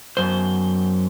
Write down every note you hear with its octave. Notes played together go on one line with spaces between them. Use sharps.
F#2 C5